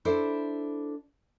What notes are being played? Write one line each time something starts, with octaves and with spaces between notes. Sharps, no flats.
D4 E4 A4 C5